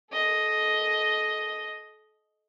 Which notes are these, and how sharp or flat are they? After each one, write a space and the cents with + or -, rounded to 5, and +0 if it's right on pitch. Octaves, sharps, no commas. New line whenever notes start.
A4 -35 D#5 +5